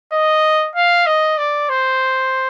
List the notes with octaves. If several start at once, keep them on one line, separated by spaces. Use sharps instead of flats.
D#5
F5
D#5
D5
C5